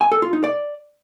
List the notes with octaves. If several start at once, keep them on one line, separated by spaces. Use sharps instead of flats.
G#5
A4
F4
D#4
D5